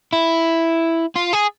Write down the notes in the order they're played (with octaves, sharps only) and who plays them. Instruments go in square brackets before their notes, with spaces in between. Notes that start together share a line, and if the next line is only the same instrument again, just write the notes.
[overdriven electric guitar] E4
F4
G#4